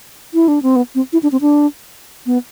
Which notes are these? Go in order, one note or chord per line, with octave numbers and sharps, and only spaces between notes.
E4
D4
C4
B3
C4
E4
D4
C4
D4
B3